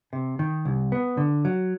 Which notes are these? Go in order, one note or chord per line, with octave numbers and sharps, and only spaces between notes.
C3
D#3
C2
B3
D3
F#3